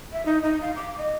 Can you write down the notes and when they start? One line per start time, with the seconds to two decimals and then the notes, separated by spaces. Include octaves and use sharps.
0.13 E5
0.25 D#4
0.43 D#4
0.62 F5
0.76 D6
0.98 D#5